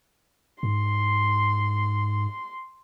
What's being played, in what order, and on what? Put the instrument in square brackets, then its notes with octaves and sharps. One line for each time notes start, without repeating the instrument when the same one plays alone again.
[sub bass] G#2 [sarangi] C6